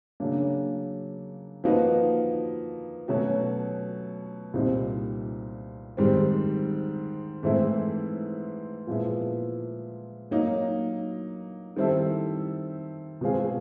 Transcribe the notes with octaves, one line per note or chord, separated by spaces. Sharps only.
C#3 F#3 A#3 D4
F3 A#3 D#4 F#4 B4
B2 F#3 A3 C#4 F#4
C2 A#2 G3 C4 D#4
G#2 D#3 G3 C4
G#2 E3 A3 C4 E4
A#2 F3 G#3 B3 E4
F#3 A#3 D#4
D#3 G3 C4 E4 A4
B2 G#3 C4 F4 G#4